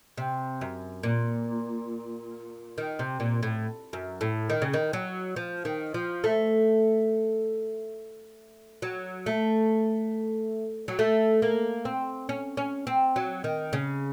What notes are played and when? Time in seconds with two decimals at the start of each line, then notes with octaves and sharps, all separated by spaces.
0.17 C3
0.61 F#2
1.03 A#2
2.78 D#3
2.99 C3
3.20 A#2
3.43 A2
3.93 F#2
4.21 A2
4.50 D#3
4.62 C#3
4.73 D#3
4.93 F#3
5.36 F3
5.65 D#3
5.94 F3
6.24 A3
8.82 F#3
9.26 A3
10.88 F#3
10.99 A3
11.42 A#3
11.85 C4
12.29 C#4
12.57 C#4
12.87 C4
13.16 F#3
13.44 D#3
13.73 C#3